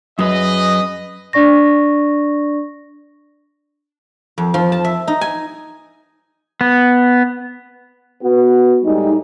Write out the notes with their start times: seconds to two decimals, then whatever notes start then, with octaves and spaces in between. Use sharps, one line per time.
0.19 F#2 G#4 B4 D#5
1.33 D4 D5 C#6 A#6
4.38 F2
4.54 F3
4.72 A5
4.84 E5
5.08 D#4
5.21 G#5
6.61 B3
8.22 B3 F#4
8.84 A2 G3 G#3 D#4